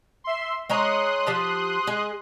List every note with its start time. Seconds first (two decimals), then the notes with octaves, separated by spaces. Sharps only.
0.24 E5 C6
0.70 G#3 C#5 A#5 C6 D#6 F#6
1.27 F3 G4 A5
1.87 G#3 G#4